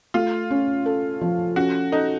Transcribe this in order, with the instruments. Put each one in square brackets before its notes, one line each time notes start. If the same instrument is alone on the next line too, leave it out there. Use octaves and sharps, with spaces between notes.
[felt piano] A3 [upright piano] F4
[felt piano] C#4
A4
F3
[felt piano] C#4 [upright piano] F#4
[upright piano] D#4 [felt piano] A4